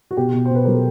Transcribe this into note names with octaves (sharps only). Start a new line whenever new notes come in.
F#4
B2 G4
B2
C5
B2 B4
F#3 A#4
A4